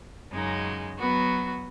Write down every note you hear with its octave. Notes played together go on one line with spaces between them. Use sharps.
F#2 C#3 G#3 D#4
F#3 B3 F#4 B4